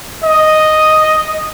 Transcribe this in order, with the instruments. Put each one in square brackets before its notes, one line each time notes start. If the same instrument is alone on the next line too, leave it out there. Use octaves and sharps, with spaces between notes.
[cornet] D#5